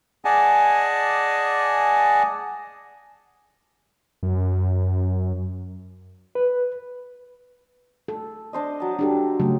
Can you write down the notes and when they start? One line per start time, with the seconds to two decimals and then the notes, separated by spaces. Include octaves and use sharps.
0.25 G#4 D5 D#5 F#5 G#5 A5
4.23 F#2
6.35 B4
8.08 A4
8.53 D4 C5 D#5
8.80 F#3 A5
8.99 D4 G4 A4
9.40 C#3 F#3 A3